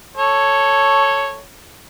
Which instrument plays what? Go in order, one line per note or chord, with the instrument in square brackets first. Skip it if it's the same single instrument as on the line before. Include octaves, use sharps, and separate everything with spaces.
[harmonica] A4 C#5